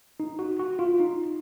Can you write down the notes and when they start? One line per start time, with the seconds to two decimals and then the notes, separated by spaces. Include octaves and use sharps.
0.20 D#4
0.39 F#4
0.59 F#4
0.79 F4
1.00 D#4